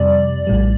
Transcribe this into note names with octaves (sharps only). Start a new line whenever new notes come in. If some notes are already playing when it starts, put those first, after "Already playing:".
Already playing: F2 C3 G3 D5
A#1 A2 G3